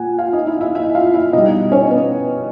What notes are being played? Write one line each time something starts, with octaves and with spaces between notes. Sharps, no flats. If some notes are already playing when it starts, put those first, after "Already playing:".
Already playing: A#2 F#5 G#5
F4 F5
D#4 D#5
E4 E5
E4 E5
E4 E5
F4 F5
E4 E5
B2 G3 D#4 D#5
C#4 C#5
B3 B4